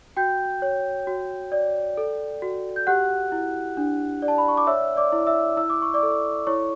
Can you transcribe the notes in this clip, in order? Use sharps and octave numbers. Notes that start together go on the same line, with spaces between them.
F#4 G5 G6
C#5
F#4
D5
A4
F#4
G6
G4 F#5 F#6
E4
D4
D5
A5
B5
C#6
D6
C#5 E5 E6
D5 D6
E4
E5 E6
E4 E6
D6
C#6
D5 D6
A4
E4 C#5 C#6